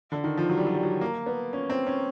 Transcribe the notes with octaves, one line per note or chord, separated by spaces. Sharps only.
D3
D#3
F3
F#3
G3
F#3
G3
F#3
A#3
B3
C#4
C4
C#4